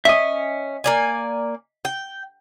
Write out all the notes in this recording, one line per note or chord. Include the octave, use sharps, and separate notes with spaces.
C#4 D#5 E5
A#3 D5 G#5
G5